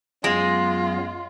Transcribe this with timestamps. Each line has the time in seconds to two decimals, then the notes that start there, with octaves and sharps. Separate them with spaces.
0.24 F#2 F#3 G#3 B3 F4